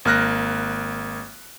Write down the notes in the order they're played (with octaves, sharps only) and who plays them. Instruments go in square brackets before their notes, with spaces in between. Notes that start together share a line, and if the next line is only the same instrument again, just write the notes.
[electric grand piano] G#1 A#3 F6 F#6 A#6